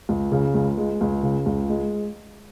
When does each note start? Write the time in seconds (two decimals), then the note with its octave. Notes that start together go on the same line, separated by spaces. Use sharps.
0.09 C#2
0.32 C#3
0.54 C#2
0.78 G#3
1.01 C#2
1.23 C#3
1.46 C#2
1.69 G#3